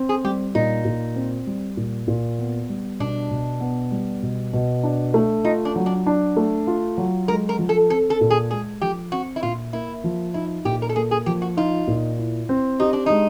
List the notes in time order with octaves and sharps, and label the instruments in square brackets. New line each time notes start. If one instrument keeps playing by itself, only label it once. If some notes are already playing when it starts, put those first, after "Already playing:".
Already playing: [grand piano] C4
[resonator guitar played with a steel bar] G#4
[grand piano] G3 [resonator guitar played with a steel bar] G4
[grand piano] A#2 [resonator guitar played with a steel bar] D#4
[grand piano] A#2
C4
G3
A#2
A#2
B3
G3
[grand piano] B2 [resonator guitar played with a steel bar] D4
[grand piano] B2
B3
G3
B2
B2
D4
A3
[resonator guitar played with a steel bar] D#4 [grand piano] F4
[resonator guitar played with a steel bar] D4
[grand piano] F#3
[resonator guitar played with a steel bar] D4
[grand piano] D4
A3
F4
F#3
[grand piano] G#3 [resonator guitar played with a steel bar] A#4
[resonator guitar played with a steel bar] A#4
[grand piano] F3
[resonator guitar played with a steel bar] A4
[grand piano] C4 [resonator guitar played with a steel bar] A4
[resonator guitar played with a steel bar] A4
[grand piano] A#2
[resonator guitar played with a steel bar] G#4
[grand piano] G#3 [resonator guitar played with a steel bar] G#4
[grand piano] F3 [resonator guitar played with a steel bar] G4
[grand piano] C4 [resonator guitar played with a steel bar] F#4
[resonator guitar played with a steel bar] E4
[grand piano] A#2 [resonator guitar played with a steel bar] F4
[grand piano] A#3 [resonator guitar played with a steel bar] E4
[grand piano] F3
[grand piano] D#4 [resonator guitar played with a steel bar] E4
[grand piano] A#2 [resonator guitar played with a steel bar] G4
[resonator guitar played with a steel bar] A#4
A4
[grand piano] A#3 [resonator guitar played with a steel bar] G#4
[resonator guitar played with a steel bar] G#4
[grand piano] F3 [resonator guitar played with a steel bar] G4
[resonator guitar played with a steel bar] F#4
[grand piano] D#4 [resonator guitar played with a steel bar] F4
[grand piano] A#2
E4
C4
[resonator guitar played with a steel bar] D#4 [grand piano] G4
[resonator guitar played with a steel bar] D4
[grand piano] G#3 [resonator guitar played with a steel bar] D#4